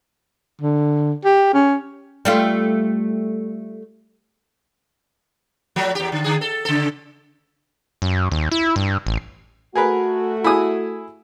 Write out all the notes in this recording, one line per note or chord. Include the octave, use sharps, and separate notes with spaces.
D3
G4
C#4
G3 A3 F4
F3 F#3 A3
E2 G4
D3
D3 G#4
A4
C#3 A4
F#2
D#2
E4
G2
A1
A3 F#4 G#4 A#4 B4
E4 G#4 D#6